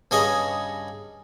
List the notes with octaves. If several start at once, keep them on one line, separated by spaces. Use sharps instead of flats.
G2 C#3 G#4 C#5 D#5